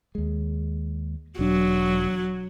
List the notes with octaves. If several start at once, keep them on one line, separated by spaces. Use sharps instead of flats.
D#2 G#3
E1 F#3 D4